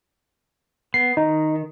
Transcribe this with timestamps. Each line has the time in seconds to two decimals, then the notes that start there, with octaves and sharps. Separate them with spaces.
0.94 B3 C7
1.17 D#3 D#4